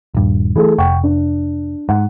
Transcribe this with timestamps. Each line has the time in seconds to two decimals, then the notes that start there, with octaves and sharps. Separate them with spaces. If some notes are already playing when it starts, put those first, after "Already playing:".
0.15 D#1 G2
0.56 E3 A3 G#4 A4
0.78 F1 F#5 G5 C#6
1.03 D4
1.89 G#2 F#5